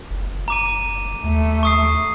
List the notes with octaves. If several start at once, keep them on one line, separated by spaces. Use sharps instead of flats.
F#1
A#5 D6 D#7
D#2 A3
C#6 D#6 C7